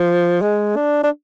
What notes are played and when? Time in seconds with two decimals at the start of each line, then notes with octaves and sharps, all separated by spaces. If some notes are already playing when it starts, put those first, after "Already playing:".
Already playing: F3
0.42 G#3
0.76 D4
1.03 D4